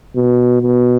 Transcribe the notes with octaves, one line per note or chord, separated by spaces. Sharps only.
B2
B2